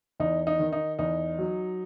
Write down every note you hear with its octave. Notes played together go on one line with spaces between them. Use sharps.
E2 D#4
D#4
D#3
D#4
E2 D#4
F#3